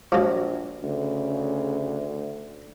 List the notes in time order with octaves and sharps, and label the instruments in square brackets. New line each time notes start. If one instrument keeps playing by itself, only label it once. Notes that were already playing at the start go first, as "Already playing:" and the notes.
[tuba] A#1 [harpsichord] F3 F#3
[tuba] D2 [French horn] C#3